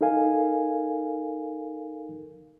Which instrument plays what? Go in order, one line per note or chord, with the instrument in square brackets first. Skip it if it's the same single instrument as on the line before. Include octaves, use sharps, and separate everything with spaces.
[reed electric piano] D#4 A4 A#4 F5 G#5